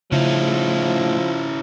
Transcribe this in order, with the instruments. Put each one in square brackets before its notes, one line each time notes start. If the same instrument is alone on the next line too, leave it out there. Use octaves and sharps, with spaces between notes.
[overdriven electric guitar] A2 D#4 [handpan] C#3 [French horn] F3 [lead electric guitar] C#4 E4